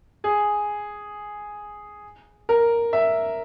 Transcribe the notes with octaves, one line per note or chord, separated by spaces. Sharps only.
G#4
A#4
E5